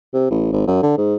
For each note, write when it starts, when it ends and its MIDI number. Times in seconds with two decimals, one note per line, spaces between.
0.14 0.28 48
0.31 0.49 33
0.52 0.65 32
0.67 0.80 42
0.83 0.96 50
0.98 1.16 44